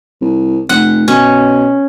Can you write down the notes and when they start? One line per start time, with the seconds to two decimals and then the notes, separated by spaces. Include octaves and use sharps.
0.22 C2
0.69 F1 F#5
1.08 B2 C#4